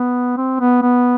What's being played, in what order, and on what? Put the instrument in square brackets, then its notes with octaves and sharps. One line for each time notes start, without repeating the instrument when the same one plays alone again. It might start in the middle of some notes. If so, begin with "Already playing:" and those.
Already playing: [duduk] B3
C4
B3
B3